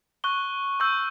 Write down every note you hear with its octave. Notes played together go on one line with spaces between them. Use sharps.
C#6 F#6 G7
C#6 E6 G6